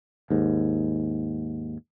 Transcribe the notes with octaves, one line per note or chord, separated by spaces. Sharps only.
D#2 G#2